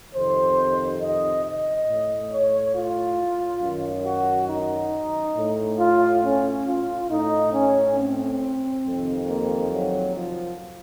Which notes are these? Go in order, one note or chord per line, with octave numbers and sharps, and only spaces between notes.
F2 C3 D#3 C5
D#5
D#5
A2
C#5
F4
F#2 D#3
F#4
D#4
A2
F4
C#4
F4
A2 D#4
C#4
C4
F2 C3 D#3
A#3
F#3
F3